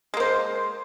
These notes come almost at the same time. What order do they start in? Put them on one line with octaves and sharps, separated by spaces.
G#3 A#3 C5